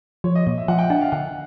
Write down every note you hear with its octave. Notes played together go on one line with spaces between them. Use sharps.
F3 C#5
D#5
A#2 D#5
E5
F3 F#5
G5
D4 F#5
F5
D3 F#5